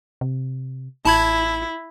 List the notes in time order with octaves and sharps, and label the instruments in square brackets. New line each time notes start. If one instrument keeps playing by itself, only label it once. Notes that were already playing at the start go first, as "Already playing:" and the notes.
[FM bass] C3
[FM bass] A1 [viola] E4 [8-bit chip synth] A5 B5 G#6